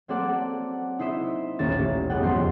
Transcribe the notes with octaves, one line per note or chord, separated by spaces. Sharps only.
F#3 A#3 C4 A4 D5 F#5
D#4 E4 C5 D#5 E5
D#1 A1 A#3 C#4 A6 E7
F#1 G3 G#3 B3 F#5 G5
F2 C6